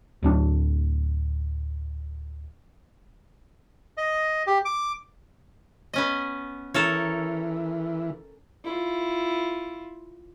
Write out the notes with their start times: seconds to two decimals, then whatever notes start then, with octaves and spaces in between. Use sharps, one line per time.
0.23 D1 F#3 D4
3.97 D#5
4.47 G4
4.65 D6
5.94 B3 C#4 D#5
6.74 E3 A4 A#4 C#5
8.64 E4 F4